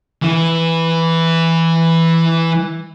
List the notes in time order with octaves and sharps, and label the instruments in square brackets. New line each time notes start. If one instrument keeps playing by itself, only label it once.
[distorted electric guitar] E3 E4